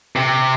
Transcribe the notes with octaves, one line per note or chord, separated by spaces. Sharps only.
C3